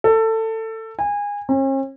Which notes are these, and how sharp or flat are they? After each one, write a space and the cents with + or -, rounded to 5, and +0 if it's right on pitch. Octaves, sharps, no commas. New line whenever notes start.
A4 +20
G#5 -25
C#4 -45